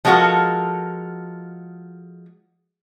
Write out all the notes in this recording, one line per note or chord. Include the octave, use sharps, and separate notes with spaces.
F3 G#3 F4 F#4 A4 A#4